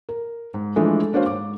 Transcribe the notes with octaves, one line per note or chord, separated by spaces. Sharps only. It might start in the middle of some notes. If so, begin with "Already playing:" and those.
A#4
G#2
E3 F3 G#3 A3 D4
A#3 D4 F#4 C5 C#5 F5
G#2 D6